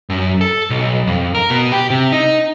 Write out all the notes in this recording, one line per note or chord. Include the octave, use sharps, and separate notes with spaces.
F#2
A4
B1
F2
A#4
B2
G4
C3
D#4